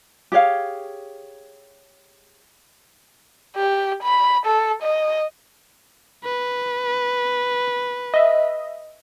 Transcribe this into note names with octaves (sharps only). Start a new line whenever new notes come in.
G4 G#4 C#5 F5
G4
B5
A4
D#5
B4
D#5 E5